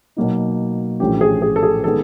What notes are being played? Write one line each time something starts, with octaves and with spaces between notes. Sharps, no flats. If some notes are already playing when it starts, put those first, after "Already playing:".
B2 F#3 A#3 D#4
A#1 A2 E3 A3 C#4 G4
G#4
G#4
A4
G#4
D#3 G#3 B3 A4